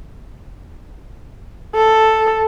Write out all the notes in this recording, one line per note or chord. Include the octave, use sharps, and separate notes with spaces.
A4